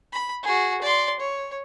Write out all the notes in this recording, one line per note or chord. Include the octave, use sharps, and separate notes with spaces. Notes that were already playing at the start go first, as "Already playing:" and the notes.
B5
F#4 G#4
D5 C6
C#5